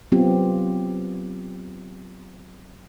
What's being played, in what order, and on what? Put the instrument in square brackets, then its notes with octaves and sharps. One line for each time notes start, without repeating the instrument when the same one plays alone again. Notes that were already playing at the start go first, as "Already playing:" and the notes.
[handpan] F#3 B3 C4 F4 G4